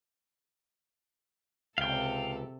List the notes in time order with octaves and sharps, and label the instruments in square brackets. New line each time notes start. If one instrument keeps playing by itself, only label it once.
[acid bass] C#2 [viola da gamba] C3 A4 [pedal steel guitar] F5 G5